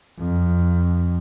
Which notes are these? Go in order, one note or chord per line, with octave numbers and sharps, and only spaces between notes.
F2